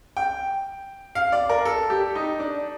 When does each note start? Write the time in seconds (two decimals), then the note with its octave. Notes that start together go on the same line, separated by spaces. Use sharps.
0.17 G5
1.15 F5
1.32 D5
1.49 A#4
1.65 A4
1.90 G4
2.15 D#4
2.40 D4